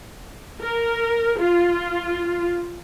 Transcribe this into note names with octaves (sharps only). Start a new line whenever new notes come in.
A#4
F4